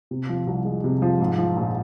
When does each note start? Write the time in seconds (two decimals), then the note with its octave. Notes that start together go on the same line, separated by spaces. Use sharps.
0.11 C3
0.29 F3
0.47 C2
0.65 G#3
0.84 C3
1.02 F3
1.20 G#2
1.38 F3
1.56 A#1